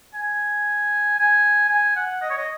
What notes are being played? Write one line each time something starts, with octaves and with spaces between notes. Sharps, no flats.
G#5
G#5
G#5
F#5
D#5
C#5
D#5